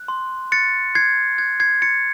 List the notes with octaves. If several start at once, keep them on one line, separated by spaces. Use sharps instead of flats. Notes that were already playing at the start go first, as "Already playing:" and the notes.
Already playing: F#6
C6
F#6 A6 C#7
F#6 G#6 C7
F#6 G#6
G#6 C7
C6 A6 C#7